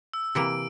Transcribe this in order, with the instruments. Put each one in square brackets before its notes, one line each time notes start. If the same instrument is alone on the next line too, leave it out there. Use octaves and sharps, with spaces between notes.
[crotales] E6
[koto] C3 E3 A#3 [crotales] D7